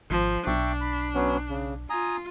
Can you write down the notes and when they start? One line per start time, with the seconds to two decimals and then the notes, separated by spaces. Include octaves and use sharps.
0.10 G#1 F3
0.47 B1 D4 E5 G5 C#6
0.81 B5
1.15 F#3 B3 C#4
1.49 C#3
1.90 F4 G#5 A#5 D#6